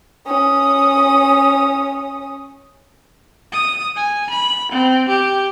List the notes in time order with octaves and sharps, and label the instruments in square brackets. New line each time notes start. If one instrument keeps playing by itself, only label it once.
[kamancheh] C#4 D#6
[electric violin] D#6
G#5
B5
C4
G4